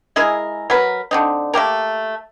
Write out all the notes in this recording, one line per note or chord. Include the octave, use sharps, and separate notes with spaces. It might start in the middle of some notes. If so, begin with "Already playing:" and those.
G#3 E4 G#4 A#4
F#3 A#4 B4
D3 C4 D#4
A3 A#3 G4 A#4